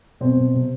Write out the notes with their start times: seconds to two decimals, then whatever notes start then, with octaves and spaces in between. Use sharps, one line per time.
0.21 B2 C4
0.37 B2
0.54 C3